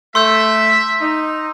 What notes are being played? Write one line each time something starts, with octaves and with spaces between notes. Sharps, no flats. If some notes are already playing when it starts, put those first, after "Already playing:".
A3 E5 C6 E6 G6
D#4